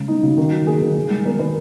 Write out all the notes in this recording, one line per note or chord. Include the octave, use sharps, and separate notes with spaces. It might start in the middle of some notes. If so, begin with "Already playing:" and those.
Already playing: C#3 G#3
B3 D#4
C#3 F#4
D#3
F#3
A#3 G#4
D#3
D#3
G#3
B3 A#4
D#3 B4